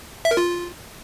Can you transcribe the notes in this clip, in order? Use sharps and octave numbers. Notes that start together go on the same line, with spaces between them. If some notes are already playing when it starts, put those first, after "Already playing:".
E5
A#4
F4